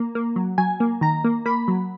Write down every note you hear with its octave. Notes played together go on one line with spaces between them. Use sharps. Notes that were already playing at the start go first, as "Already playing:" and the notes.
Already playing: A#3
A#3
F#3
F#3 G#5
A#3
D#3 A#5
A#3
A#3 B5
F#3